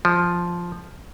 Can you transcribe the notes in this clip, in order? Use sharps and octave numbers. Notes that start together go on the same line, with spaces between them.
F3